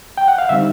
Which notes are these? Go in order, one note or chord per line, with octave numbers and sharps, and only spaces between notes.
G5
F#5
F5
D3 G3 C4 D#4 E5